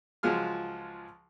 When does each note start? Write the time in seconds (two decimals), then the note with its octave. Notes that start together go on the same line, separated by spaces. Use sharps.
0.23 C#2 F3 F#3 G#3 F4 F6